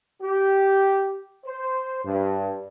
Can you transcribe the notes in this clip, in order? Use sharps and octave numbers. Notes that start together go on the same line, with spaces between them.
G4
C5
G2